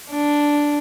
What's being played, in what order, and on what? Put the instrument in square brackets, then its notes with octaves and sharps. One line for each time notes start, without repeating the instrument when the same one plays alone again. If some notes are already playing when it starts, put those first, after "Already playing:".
[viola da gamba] D4